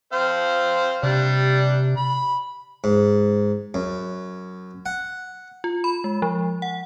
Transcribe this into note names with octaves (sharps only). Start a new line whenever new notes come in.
C4 C5 F5
C3 G3 D4
B5
G#2
F#2
F#5
F4
B5
G#3
F3
F#5